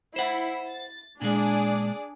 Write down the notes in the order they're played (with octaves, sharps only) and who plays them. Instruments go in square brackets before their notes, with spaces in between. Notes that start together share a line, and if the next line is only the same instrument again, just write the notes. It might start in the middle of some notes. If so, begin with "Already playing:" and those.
[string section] E4 [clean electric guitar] C5 F#5
[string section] A6
[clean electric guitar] A#2 G#3 [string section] D4 G#4 D5